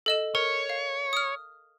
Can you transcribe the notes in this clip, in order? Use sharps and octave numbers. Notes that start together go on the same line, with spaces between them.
A4 D#5 E7
A#4 C#5
F5
D#6 F6